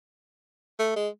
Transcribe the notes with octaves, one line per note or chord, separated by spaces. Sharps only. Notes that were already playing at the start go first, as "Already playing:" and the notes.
A3
G#3